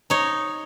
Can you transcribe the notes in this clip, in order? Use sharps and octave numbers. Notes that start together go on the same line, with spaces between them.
D#4 C#5